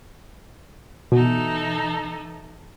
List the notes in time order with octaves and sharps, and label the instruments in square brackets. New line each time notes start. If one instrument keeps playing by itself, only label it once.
[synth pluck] B2 [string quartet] E3 D#4 A4